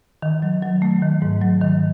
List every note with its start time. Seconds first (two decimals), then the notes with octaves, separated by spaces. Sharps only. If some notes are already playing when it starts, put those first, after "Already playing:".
0.22 D#3
0.42 F#3
0.62 F#3
0.82 A3
1.02 D#3
1.22 G#2
1.41 F#3
1.61 D#3